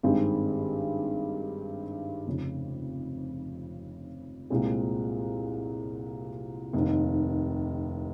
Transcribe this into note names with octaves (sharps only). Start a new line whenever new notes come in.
G#1 G2 D#3 G#3 C4
F1 F2 C#3
C2 A#2 G#3 C4
F1 D#2 D#3